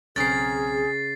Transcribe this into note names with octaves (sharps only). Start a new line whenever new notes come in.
B1 C#3 C4 G#4 A#4 A6 C7